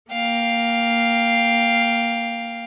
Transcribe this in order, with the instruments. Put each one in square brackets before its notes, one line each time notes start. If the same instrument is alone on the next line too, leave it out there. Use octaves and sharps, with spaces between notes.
[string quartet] A#3 F5 G5